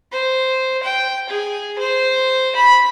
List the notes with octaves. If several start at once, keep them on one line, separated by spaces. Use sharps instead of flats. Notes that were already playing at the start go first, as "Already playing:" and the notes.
C5
G5
G#4
C5
B5